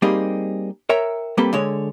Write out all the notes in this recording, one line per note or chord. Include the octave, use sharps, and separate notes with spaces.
G3 A#3 C4 D#4 G4 G#4
A#4 C#5 E5 G5 A#5
G3 A#3 C4 G4 A4 B4
D3 G#3 C#5